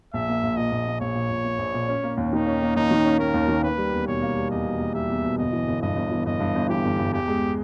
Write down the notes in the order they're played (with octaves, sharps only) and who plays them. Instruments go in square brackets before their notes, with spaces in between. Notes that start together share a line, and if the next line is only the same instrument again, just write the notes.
[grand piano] A#1 [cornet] E5
[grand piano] A#3
A#1
[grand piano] A#2 [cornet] D#5
[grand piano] A#1
A#3
[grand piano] A#1 [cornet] C#5
[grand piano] A#2
A#1
A#3
A#1
A#2
C#4
A#3
D#2
[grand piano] D#3 [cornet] D#4
[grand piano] C#4
A#3
[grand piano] D#2 [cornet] D#4
[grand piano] D#3
C#4
[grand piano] A#3 [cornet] A#4
[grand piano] D#2
D#3
[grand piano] A#3 [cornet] B4
[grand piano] G3
E2
[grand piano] B2 [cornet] C#5
[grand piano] A#3
G3
[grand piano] E2 [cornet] D#5
[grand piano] B2
A#3
[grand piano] G3 [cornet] E5
[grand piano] E2
B2
[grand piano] G1 [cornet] D#5
[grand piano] E3
G1
[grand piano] G2 [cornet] D#5
[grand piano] G1
E3
[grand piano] G1 [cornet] D#5
[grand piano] G2
G1
[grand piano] E3 [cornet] G4
[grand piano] G1
G2
[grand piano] E2 [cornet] G4
[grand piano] G#3